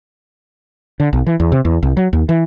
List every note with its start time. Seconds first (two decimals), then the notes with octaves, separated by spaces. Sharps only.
1.00 D3
1.13 B1
1.27 E3
1.40 E2
1.52 C3
1.65 E2
1.83 C2
1.97 F#3
2.13 D#2
2.29 E3